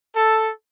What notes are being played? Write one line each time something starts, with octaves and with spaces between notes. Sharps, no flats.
A4